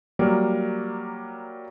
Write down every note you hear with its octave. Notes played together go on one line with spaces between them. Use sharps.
F#3 G3 A#3 A#4